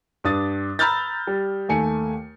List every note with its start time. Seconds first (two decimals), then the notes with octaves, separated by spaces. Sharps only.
0.24 G2 D4 D#6 A6
0.79 A#5 B5 E6 F6 G6 A6
1.27 G3
1.69 D#2 A3 G#5 C#7